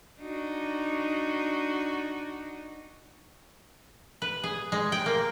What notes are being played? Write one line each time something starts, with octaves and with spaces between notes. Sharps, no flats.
D4 D#4 F#4
B4
G#4
G#3
G5
A#3